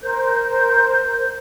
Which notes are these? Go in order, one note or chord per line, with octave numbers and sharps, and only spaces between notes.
A#4 C5 G6